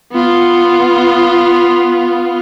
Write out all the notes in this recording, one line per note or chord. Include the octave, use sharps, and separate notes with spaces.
B3 F4